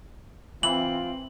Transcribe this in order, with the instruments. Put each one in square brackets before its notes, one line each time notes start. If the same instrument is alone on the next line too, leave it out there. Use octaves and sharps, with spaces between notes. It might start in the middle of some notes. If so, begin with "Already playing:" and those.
[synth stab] E3 [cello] C4 [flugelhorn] F4 [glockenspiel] F#7